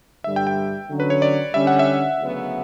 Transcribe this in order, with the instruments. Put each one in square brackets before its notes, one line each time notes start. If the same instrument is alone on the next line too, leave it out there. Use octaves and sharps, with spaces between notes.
[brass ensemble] G2 D3 G3 [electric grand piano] E5
[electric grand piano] G5
G5
[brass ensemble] D3 F#3 C#4
[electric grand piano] B4
C#5
D5
[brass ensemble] D3 G3 C#4 [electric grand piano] E5
[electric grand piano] F#5
E5
[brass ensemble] D2 C#3 F#3 B3